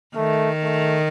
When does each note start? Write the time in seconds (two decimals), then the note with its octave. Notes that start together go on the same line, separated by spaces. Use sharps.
0.16 D#3 A3
0.64 A3